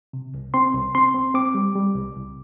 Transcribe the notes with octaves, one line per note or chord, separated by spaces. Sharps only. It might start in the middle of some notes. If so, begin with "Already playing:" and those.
C3
C2
C4 C6
C2
C4 C6
C4
C4 D6
G3
G3
C2
C2